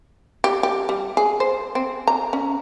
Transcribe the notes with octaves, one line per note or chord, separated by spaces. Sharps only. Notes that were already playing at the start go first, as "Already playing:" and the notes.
G4
G4
G3
G#4
C5
C4
A#5
C#4